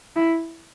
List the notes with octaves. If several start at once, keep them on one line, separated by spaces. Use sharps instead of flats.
E4